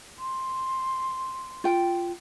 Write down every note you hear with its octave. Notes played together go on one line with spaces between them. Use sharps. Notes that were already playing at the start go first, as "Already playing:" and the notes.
C6
F4 G5